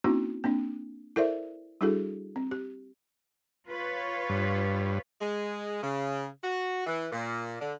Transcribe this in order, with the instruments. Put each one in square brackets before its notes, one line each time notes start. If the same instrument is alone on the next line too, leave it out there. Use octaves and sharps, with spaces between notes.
[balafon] A#3 C4 C#4 D#4 E4 F#4
A#3 C4 D4
E4 A4 A#4 C5 D5 E5
G3 D4 E4 F#4 G#4 A4
C4
G4
[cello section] F4 B4 C#5
[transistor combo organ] G2
[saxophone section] G#3
C#3
F#4
E3
A#2
D3